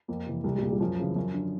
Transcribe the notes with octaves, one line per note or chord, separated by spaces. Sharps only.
F2 A#3
C3 E3
C2 G3
G#3
G3
A#2 G#3
G3
F#2 F3
C#3 E3
F#2
D3